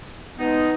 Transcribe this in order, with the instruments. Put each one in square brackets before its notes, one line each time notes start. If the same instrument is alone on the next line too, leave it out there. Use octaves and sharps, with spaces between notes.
[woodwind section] B2 G#3 B3 D#4